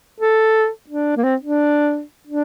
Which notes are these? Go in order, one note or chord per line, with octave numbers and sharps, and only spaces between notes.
A4
D4
A#3
C4
D4
D4